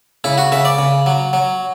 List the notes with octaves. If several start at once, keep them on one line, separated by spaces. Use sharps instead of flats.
C#3 E4
F#4
C#3 E5
D5
C#3
F#3
F#3